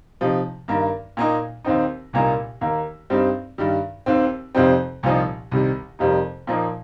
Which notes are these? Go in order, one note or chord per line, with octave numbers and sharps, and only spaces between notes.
C3 F3 D#4
G2 D#3 A#3
A#2 A#3 D#4
D#2 D#3 C4 D#4
C2 A#2 A#3 D#4
D#2 D#3 A#3
G2 G3 C4 D#4
G2 D#3 G3
D#2 D#3 C4
F2 C3 G3 C4 D#4
C2 A#2 F3 D#4
C2 C3 D#3
F2 C3 G3 A#3 D#4
A#2 F3 A#3 D#4